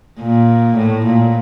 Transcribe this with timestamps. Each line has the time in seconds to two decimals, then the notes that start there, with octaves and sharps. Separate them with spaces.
0.20 A#2
0.77 A2
1.05 A#2